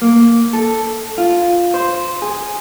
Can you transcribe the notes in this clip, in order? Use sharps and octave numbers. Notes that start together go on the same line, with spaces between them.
A#3
A4
F4
C5
G#4